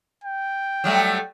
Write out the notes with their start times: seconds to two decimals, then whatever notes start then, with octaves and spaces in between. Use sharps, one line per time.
0.24 G5
0.84 F#3 G3 A3